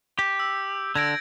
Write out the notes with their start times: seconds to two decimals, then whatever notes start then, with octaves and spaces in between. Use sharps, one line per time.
0.19 G4 G6
0.40 E6
0.95 D3 G#6 A#6 D7